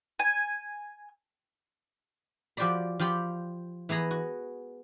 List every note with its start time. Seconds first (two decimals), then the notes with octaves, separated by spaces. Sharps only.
0.19 G#5
2.57 F3 F#4 G4 C5 D5 B5
3.00 F3 F4 G4 B5
3.89 E3 B3 G#4 A#5 B5
4.11 F#4